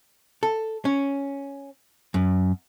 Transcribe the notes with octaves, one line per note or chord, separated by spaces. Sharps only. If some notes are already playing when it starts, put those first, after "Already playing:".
A4
C#4
F#2